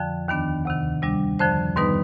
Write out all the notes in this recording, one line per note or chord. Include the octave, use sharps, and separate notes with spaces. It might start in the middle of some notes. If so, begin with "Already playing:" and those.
Already playing: F2 D3 F3 G5
D#2 D#3 B3 D4
D2 C3 D#3
C3 G3 D4
F2 D3 F3 C5
G#2 D#3 G3 B3 D#4 B4